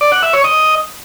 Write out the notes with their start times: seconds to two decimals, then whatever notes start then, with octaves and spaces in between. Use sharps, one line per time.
0.01 D5
0.12 F#5
0.23 E5
0.33 C#5
0.44 D#5